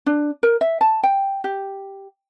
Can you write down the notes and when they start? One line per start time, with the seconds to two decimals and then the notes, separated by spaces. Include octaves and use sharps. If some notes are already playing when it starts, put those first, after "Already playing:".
0.06 D4
0.43 A#4
0.61 E5
0.81 A5
1.03 G5
1.44 G4